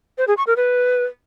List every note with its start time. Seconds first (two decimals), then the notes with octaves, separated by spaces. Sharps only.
0.18 C5
0.28 G#4
0.37 C#6
0.47 A#4
0.56 B4